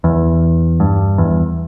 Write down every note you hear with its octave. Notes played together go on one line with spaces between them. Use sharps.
E2
G2
E2